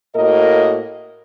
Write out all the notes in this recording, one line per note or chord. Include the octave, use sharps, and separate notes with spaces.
A2 A#3 F#4 A#4 D#5